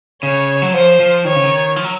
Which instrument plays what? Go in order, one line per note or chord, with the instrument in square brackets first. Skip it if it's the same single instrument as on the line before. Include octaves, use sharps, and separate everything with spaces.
[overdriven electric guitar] C#3 [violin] C#5
[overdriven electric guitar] F#3
[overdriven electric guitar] F3 [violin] C5
[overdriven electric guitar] F3
[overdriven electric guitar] D#3 [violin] C#5
[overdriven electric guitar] C#3
D#3
F3
F#3